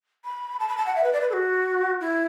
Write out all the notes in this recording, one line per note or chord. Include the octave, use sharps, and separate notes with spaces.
B5
A5
B5
A5
F#5
E5
B4
D5
B4
A4
F#4
E4